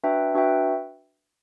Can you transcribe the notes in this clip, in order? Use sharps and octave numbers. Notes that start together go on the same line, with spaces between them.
D4 F#4 B4 E5 G5
D4 F#4 B4 E5 G5